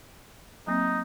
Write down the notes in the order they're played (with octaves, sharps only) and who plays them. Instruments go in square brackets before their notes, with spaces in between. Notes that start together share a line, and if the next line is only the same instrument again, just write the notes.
[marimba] F#3 A#3 C4 [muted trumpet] D#4